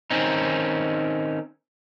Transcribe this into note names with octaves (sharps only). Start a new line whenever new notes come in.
D#3 C4 C#4 D#4